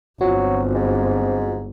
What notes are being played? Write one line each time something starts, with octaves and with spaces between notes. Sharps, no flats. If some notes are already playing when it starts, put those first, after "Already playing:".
G1 F#3 C4 F4 F#4
G#2